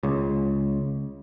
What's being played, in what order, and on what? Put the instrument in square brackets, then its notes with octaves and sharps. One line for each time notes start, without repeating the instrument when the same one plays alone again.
[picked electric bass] C#2 C#3